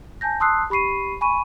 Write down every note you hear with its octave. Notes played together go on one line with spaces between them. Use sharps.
G#5 A5 G6 A#6
A5 C6 D#6 E6 F#6 C7
G4 B5 C#6 C7 D#7
G#5 B5 C#6 D#7